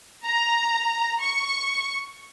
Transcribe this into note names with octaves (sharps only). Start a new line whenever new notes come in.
A#5
C#6